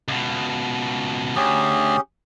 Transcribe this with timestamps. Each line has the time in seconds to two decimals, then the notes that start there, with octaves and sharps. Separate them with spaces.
0.08 C#2 B2
1.36 D2 C#4 G4 G#4